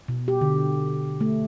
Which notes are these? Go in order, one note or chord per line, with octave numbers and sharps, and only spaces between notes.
B2
G4
D3
A3